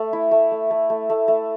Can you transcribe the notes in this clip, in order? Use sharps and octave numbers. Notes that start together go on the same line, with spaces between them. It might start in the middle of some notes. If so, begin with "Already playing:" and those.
Already playing: A3
E4
A3
A3
A3
A3
A3
A3